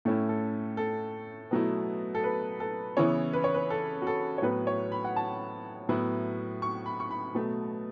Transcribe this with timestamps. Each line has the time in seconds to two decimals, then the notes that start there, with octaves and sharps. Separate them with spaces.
0.05 A2 A3 C#4 E4
0.29 A4
0.77 A4
1.51 B2 F#3 A3 E4
2.15 A4
2.24 B4
2.60 A4
2.97 C#3 E3 B3 E4 C#5
3.33 B4
3.44 C#5
3.54 B4
3.70 A4
4.02 F#4
4.07 A4
4.38 C#5
4.42 A2 F#3 B3 E4 B4
4.67 C#5
4.92 B5
5.05 F#5
5.16 A5
5.89 A2 F#3 B3 E4
6.62 C#6
6.86 B5
7.00 C#6
7.11 B5
7.35 B2 F#3 A3